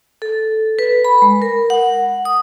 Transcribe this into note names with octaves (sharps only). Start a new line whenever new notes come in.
A4
B4
B5
G#3
A#4
F#5
D#6